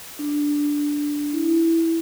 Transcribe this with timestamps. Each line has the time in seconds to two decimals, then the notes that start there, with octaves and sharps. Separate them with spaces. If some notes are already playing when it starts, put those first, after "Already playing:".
0.19 D4
1.33 E4